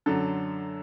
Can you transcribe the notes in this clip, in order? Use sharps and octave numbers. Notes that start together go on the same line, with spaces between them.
F#2 D3 F#3 A4